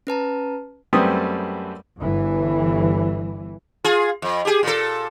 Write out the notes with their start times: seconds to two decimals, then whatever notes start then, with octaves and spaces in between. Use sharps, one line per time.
0.07 C#4 B4 A5 A#5
0.93 F#2 G3 A3 C4 B4 D#6
2.00 G1 G2 E3
3.84 F4 G#4
4.22 F2
4.45 G4 G#4
4.63 A#2 A4